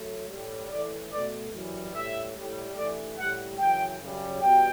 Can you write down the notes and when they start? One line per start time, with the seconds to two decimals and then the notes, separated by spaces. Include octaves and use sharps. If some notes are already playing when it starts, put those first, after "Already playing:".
Already playing: F#3 A3
0.28 A2 G3
0.69 A2 E3 A3 D5
1.11 B2 A3 D5
1.52 F#2 E3 G3
1.93 A2 G3 E5
2.35 A2 G3
2.76 G2 E3 A3 D5
3.17 A2 G3 F#5
3.58 F#2 C#3 E3 G5
4.00 F#2 C#3 G3
4.41 E2 B2 G3 G5